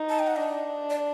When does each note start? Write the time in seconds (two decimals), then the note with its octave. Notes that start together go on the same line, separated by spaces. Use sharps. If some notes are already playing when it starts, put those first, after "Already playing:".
Already playing: D#4
0.09 A5
0.19 G5
0.27 F#5
0.36 D4 D#5
0.90 D5